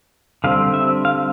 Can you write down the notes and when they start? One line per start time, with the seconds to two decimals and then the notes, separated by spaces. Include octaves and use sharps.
0.44 D3 G3 C4 F5
0.74 E5
1.05 F5